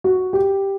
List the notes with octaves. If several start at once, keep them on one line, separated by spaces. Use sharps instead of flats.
F#4
G4